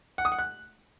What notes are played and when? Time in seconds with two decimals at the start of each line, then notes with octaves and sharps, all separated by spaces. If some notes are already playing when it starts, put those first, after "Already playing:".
0.18 F#5
0.25 D#6
0.32 F#5
0.39 F#6